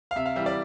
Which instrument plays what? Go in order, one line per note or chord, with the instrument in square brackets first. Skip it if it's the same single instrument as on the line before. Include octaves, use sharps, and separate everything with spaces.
[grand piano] F5
C3 E5
F5
E3 G3 E5
D5